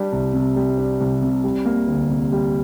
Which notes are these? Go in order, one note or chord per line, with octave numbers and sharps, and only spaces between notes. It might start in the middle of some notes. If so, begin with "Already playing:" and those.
Already playing: G3 D4
C2
C3
G3
D4
C2
C3
G3
A#3
D2
C3
G3